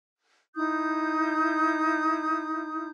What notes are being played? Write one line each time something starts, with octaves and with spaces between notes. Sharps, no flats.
D#4 E4 D#6 G6